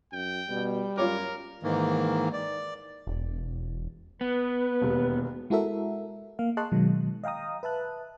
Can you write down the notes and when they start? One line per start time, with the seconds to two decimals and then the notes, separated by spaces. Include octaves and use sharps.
0.13 F#2 G5
0.50 B2 G3
0.98 F#2 F4 A#4 C#5 D6
1.63 G#2 D#3 E3 A#3
2.33 D5
3.07 E1
4.21 B3 B4
4.81 E1 D#2
5.50 G#3 E4 F#4 A4 A#4 E5
6.39 A#3 F5
6.57 G#4 D#5 A5 C6 C#6 F#6
6.72 B2 D#3 F#3 G#3
7.24 D#5 F5 G5 A#5 D#6
7.63 B4 E5 A5 F#6